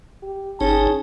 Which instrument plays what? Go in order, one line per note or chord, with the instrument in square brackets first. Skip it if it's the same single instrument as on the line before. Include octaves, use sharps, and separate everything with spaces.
[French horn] G4
[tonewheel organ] G1 D#4 [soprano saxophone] C#4 [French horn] G#4 [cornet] A5